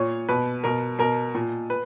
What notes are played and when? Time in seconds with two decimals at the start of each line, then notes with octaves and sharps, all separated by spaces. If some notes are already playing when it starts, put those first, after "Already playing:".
Already playing: A#2 C#5
0.29 B2 B4
0.64 B2 A#4
0.99 B2 A#4
1.35 A#2
1.70 B4